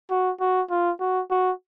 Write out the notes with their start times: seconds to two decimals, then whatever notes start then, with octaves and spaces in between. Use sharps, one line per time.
0.11 F#4
0.41 F#4
0.70 F4
1.00 F#4
1.30 F#4